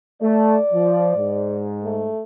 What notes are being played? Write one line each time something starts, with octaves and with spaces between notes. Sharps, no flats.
A3 D5
F3
G#2
A3